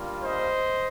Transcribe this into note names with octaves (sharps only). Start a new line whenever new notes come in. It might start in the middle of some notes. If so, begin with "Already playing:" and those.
Already playing: G3 A#3 D4 F4
C5 D#5